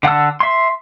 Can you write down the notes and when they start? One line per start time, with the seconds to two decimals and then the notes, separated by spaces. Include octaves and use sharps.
0.03 D3 F#5 A5 E6
0.40 E5 C6